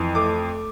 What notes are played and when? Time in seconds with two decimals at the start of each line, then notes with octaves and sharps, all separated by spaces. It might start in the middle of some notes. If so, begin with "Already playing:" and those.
Already playing: F2 E3
0.15 A3 D6